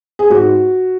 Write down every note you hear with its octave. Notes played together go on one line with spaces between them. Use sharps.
G#4
G#2 F#4